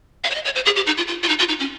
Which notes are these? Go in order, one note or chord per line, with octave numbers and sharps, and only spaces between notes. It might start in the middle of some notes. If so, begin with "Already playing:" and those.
F5
C#5
D#5
C#5
C5
G#4
G4
D#4
F4
F4
F4
D#4
F4
D#4
C#4